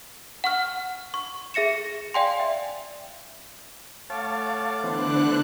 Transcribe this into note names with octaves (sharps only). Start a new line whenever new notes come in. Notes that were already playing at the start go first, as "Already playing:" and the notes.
F#5 C#6 F6
C#6
G#4 E5 A#6 C#7 E7
D5 F5 G5 G#5 C6
E5
A3 C#5 F5 F#5 A5 D6
D3 E3 B3 D4 C5 F#6